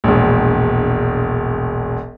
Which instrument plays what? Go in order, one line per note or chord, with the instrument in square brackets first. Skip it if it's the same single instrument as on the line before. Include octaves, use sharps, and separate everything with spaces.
[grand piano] E1 A#1